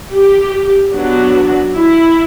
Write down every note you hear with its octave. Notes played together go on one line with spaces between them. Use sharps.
G4
F#3 B3 D4 F#4
E4